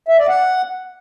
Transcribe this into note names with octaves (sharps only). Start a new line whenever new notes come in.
E5
D5
F#5